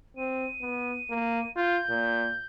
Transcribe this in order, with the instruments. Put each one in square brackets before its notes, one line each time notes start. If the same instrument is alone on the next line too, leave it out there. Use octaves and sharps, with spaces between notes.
[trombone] C4 [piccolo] D#7
[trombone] B3
A#3
[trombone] F4 [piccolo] G6
[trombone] A#2